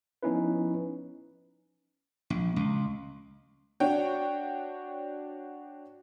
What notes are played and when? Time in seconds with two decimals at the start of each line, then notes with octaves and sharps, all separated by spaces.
0.23 F3 B3 C#4 D#4 E4 B4
2.30 A#1
2.56 C#2
3.80 D4 F#4 C#5 G5